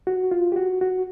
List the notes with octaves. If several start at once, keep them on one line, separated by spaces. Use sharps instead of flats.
F#4
F4
G4
F#4
F#4